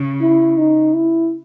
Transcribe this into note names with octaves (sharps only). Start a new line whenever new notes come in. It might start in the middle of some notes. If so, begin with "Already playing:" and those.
Already playing: C#3
E4
D#4
E4